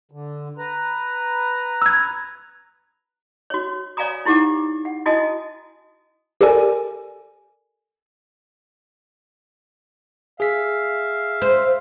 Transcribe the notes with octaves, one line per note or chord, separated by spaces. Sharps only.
D3
B4 A#5
E6 G#6
F#4 C#5
C#5 D5 F5 G#5 A#5 D#6
D#4 E4 G4 F#5 D6
F#5
E4 F#4 D#5 G#5 A5 D#6
G4 A4 A#4 D5 G#5
G#4 E5 F5 B6
C5